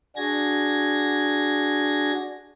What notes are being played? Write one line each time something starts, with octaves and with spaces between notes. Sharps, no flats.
D4 F#4 G#4 G#6 A#6